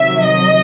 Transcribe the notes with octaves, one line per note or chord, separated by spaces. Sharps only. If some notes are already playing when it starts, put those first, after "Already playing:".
Already playing: C3 D#3 F#3 E5
D#5